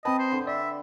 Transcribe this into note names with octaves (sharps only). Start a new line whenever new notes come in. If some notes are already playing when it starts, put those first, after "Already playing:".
C4 B4 D#5 G5 A5 B5
C5
D3
D5 E5